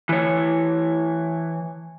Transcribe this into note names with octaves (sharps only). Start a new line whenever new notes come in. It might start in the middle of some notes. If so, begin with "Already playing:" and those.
E3 C#5